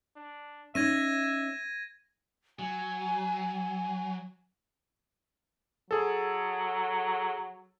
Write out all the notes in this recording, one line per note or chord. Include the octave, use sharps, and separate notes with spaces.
D4
C#4 D#4 E5 G#6 A#6 D#7
F#3 G#5
F#3 G#4 A4